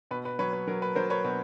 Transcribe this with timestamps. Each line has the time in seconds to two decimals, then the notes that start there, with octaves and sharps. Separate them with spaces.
0.11 B2 B4
0.25 B4
0.39 F#3 B4 C#5
0.53 B4
0.67 F#3 A#4
0.82 B4
0.95 F#3 A#4 C5
1.10 B4 C#5
1.24 B2 B4